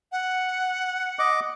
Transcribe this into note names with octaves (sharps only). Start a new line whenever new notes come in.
F#5
D#5 D6